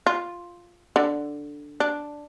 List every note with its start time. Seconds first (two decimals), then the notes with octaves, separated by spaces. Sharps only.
0.07 F4
0.96 D3
1.80 D4